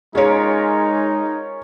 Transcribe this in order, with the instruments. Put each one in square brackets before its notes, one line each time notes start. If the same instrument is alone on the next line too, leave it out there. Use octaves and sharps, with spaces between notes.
[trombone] G#3 [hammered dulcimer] C#4 F4 A#4 [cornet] D#4 [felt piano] G#4 C#5